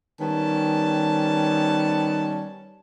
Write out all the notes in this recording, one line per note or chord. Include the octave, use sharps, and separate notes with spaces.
D#3 G3 B3 C#4 A5